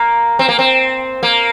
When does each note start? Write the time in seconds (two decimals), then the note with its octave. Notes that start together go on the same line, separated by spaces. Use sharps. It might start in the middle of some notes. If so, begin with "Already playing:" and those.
Already playing: A#3
0.39 C4
0.49 A#3
0.59 C4
1.23 A#3